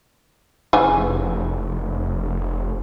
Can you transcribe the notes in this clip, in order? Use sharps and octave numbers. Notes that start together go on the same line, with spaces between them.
F1 C#3 E3 G#5